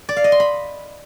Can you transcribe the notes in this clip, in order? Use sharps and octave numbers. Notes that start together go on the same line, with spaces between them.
D5
F5
D#5
C6
B5